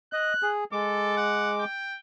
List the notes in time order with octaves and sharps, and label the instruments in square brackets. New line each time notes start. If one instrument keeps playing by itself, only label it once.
[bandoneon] D#5 [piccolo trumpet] F#6
[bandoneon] G#4
[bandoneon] G#3 D6 [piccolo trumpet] A4
[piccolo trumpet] F#5
G5